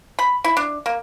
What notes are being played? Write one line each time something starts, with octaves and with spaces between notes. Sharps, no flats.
B5
E4
D4
A#3